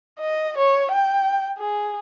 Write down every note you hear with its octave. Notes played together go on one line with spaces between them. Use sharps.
D#5
C#5
G5
G#4